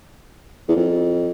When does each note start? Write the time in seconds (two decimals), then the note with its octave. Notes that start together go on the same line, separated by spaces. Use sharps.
0.68 E2
0.76 F2